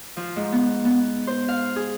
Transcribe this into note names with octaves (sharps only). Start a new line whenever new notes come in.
F3
G#2
B3
B3
C5
F5
G#4